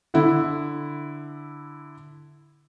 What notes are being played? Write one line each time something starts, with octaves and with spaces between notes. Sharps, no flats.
D3 E4